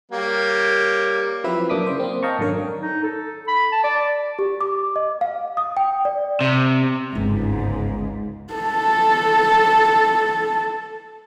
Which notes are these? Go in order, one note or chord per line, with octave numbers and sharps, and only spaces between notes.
G3 A#3 C#5
F3 F#3 C4 E4 B4 E5
F#2 A#3 D4 D6 D#6 B6
C#3 C5
A#3 C4
D#5 F5 G5 A5 A#5 C#6
G#1 F#2 D3 A#4 C#5
D#4
A4
B5
A5
D5
G4
D6
D#5
F5
D#6
G5
D5
C3
G1 C#2 G#2 B3
A4 A5